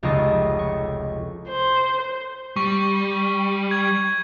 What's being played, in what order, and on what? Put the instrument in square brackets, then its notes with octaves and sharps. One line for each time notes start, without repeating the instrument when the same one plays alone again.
[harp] F1 C#2 F4 A4 D#5 C#6
C#6
[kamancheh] C5
[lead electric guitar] G3 [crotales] C#6
[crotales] G#6